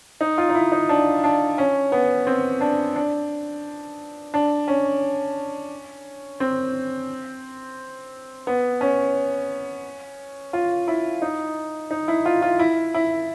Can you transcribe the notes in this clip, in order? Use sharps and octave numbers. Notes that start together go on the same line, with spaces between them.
D#4
F4
D#4
E4
D#4
D4
D4
C#4
B3
C4
D4
D4
D4
C#4
C4
B3
C#4
F4
E4
D#4
D#4
E4
F4
F4
E4
E4